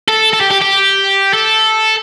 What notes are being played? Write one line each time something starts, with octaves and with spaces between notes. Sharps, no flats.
A4
A4
G4
G4
G4
A4